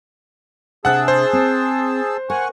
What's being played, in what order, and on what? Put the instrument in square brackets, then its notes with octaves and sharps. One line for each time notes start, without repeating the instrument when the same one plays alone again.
[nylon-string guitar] C3 D4 E5 [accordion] G#4 A5 E6 [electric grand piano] F#5 F#6
[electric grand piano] C5
[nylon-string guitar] C4
[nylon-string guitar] A#4 [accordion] F#5 G#5 C#6